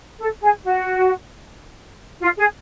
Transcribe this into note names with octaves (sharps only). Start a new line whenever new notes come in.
A4
G#4
F#4
F4
G#4